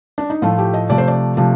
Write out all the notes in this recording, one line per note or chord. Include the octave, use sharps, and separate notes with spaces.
D4
D#4
A2 F3 A3 F4
G4
D#5
C3 F3 A3 D5
C5
D5
C3 F3 A3